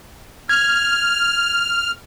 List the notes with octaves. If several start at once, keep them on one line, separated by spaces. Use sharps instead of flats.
F6 G#6